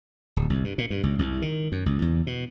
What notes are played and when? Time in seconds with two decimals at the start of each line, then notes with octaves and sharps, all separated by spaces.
0.36 D1
0.50 C2
0.64 G2
0.78 A#2
0.90 G2
1.03 C#2
1.19 C2
1.42 D#3
1.72 F#2
1.86 C#2
2.02 E2
2.27 B2